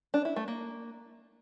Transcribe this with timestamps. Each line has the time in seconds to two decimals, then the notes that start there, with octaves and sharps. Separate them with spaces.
0.14 D4
0.25 E4
0.36 A3
0.48 A#3